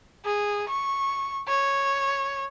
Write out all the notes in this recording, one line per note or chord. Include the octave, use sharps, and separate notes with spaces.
G#4
C#6
C#5